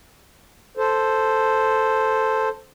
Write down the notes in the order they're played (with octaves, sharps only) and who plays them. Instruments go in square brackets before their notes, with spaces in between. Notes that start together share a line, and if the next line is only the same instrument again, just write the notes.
[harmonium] A4 C5